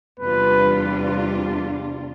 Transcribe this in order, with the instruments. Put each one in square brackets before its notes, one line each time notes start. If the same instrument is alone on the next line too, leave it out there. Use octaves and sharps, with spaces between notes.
[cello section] E2 C3 G3 D4 F4 [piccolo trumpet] B4